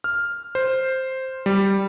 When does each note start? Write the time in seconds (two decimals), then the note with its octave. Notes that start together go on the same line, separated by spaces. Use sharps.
0.04 F6
0.55 C5
1.46 G3